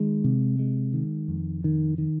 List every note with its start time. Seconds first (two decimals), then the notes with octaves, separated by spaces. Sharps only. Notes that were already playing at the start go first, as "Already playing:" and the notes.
Already playing: D#3 G#3
0.24 C3
0.59 G#3
0.93 D#3
1.28 F2
1.64 D#3
1.98 D#3